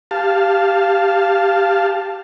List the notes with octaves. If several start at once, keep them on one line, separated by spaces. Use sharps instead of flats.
G4 F5 A5